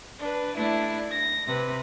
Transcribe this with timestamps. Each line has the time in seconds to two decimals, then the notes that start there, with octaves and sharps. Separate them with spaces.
0.18 D4 B4
0.56 A3 D4 E4
1.11 A#6
1.47 C3 B4